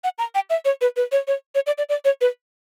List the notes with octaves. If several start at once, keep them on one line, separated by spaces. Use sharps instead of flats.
F#5
A#5
G5
E5
C#5
B4
B4
C#5
C#5
C#5
D5
D5
D5
C#5
B4